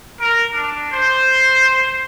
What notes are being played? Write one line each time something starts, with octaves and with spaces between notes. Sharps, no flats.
A#4
D4
C5